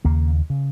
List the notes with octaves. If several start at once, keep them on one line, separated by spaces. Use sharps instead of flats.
D#2 C#3 A#3
C#3